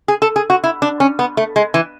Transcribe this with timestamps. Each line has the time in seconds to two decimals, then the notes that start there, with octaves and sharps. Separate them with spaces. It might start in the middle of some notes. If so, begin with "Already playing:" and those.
0.08 G#4
0.22 A4
0.36 G#4
0.50 F#4
0.64 E4
0.82 D4
1.00 C#4
1.19 B3
1.37 A3
1.56 G#3
1.74 E3